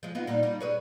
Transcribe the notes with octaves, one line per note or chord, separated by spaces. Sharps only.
F3 G#3
B3 D#4 F4
A#2 G3 D#4
G3 D#4
G#4 B4 C#5